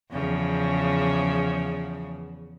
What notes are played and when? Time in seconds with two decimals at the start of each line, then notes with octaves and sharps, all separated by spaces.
0.11 E2 C#3 F3